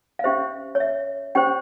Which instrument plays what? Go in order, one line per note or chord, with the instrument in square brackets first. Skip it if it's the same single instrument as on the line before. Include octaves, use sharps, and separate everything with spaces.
[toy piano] F5
C#4 G4 C5 E5
C#5
E5
C#4 G4 C5 G5